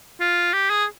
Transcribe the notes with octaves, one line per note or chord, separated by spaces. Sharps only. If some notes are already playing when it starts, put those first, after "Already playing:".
F4
G4
G#4